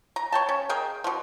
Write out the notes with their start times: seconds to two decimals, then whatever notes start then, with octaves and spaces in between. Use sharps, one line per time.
0.16 A#5
0.32 C#5 G5 A5
0.49 C#4
0.69 G#4 A#4 D#5 G5
1.04 B2 F3